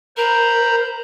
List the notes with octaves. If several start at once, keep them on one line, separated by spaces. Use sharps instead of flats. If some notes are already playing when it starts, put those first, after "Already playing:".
A#4 C5 A#5 B5